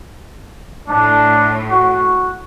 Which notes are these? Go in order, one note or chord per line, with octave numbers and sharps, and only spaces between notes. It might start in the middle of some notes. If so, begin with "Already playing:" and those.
A2 D4
F#4